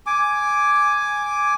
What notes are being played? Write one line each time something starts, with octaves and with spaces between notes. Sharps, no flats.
G#5 D6